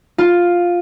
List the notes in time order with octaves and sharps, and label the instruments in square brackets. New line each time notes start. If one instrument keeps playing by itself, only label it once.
[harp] F4